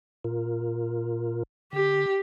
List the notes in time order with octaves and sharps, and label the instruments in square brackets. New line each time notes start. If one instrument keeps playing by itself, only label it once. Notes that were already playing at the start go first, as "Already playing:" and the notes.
[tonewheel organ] A#2 F4 A#4
[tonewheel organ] D3 [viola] G4